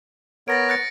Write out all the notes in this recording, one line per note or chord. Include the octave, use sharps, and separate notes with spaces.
B3 A#4 C#5 A6 A#6 D7
F#6 A6 C#7